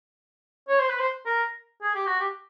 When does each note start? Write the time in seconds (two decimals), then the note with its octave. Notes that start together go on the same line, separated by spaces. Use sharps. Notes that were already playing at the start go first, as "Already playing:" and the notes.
0.69 C#5
0.79 C5
0.89 B4
0.99 C5
1.26 A#4
1.82 G#4
1.95 G4
2.06 F#4
2.20 G4